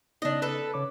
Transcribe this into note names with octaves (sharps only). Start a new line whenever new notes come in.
C#3 B3 D4 D#4 D#5
A4 B4
C#3 C#5 D6